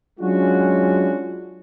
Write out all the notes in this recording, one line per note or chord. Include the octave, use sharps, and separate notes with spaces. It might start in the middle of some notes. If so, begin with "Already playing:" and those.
F#3 G#3 C#4 D4 F4 F#4